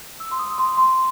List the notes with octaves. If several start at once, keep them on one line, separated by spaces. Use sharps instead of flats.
E6
C6
D#6
C6
C6